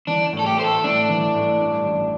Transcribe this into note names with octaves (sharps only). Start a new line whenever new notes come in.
E3 D4
A2
A4
G4
A3 C5
A4
A2 D4
E3
A2
G2
A1